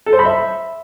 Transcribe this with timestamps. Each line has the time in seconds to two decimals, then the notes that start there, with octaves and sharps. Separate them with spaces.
0.06 A4
0.13 C5
0.19 B5
0.25 E5